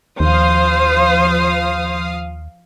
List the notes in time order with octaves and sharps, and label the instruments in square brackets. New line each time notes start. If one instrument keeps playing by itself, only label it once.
[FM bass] D#2 [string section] F3 F5 D#6 [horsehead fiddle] C5